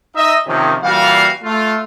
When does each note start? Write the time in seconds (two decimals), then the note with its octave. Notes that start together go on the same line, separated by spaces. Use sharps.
0.15 D#4 D#5 E5
0.46 C3 D#3 F3 A#3 C#4
0.84 A#2 E3 G3 F#4 F5
1.44 A3 F4